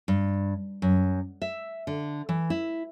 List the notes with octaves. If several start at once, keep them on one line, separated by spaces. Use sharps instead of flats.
G2
F#2
E5
D3
E3
E4